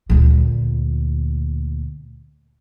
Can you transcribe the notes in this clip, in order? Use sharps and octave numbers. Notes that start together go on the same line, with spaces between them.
D2 A#2